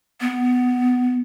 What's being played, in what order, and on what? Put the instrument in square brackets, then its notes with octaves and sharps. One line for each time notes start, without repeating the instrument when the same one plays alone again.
[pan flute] B3